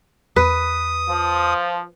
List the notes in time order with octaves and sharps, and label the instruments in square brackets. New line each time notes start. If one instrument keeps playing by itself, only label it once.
[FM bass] E2 [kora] B4 [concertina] D#6
[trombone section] F3